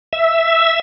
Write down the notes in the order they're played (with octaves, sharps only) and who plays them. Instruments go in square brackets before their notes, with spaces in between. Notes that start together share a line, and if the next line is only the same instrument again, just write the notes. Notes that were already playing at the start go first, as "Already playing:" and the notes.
[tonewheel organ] E5